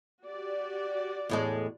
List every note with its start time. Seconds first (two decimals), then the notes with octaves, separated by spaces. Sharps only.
0.24 F#4 G4 D5
1.29 E2 A2 G#3